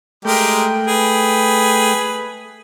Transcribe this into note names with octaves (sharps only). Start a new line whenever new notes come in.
G#3 A3 G4 A#4 G5
G#4 B4